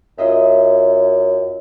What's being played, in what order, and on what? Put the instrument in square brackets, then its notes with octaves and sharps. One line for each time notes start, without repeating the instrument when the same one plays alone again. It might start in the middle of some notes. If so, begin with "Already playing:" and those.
[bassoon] F#2 [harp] F4 D#5 E5